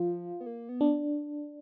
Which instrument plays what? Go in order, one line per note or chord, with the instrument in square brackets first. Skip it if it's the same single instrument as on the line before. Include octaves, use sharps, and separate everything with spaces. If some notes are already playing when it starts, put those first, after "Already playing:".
Already playing: [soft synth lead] F3 [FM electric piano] F4
[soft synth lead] B3
A#3
B3
[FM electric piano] D4